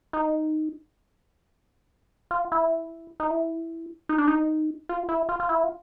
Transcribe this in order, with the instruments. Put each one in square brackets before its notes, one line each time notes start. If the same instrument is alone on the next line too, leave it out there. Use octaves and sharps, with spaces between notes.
[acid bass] D#4
F4
E4
D#4
E4
D#4
D4
D#4
F4
E4
F4
F4
E4
F4